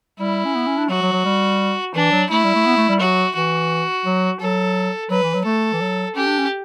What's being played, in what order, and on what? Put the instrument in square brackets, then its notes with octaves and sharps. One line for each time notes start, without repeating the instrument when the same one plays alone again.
[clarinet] G3 [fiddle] E4
[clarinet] C#4
B3
C#4
D4
[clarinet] F#3 [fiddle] F#4
[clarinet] F#3
F#3
G3
[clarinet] E3 [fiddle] D4
[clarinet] F#3
[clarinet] A3 [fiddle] E4
[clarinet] G3
A3
B3
A3
G3
[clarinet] F#3 [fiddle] F#4
[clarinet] E3 [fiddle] F#4
[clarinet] F#3
[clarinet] F#3 [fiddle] A4
[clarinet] F#3 [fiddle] B4
[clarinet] E3
F#3
[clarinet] A3 [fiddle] A4
[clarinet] E3
F#3
[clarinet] C#4 [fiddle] G4
[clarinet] D4
C#4